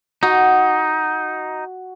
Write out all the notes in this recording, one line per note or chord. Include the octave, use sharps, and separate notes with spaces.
D#4 F#4